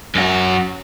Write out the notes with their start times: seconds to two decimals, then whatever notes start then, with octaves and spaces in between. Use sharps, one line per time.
0.15 F#2 F#4